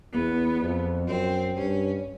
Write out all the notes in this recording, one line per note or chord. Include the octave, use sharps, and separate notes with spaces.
E2 B3
F2
F#2 C4
G2 C#4